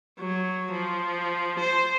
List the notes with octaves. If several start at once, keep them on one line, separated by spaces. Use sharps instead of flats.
F#3
F3
C5